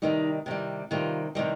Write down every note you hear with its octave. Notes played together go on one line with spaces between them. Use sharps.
C3 D#3 G3 D#4
C3 D#3 G3
C3 D#3 G3 F4
C3 D#3 G3